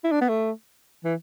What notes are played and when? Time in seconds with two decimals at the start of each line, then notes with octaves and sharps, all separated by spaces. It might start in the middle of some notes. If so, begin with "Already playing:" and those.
0.04 E4
0.12 D4
0.21 B3
0.29 A3
1.04 E3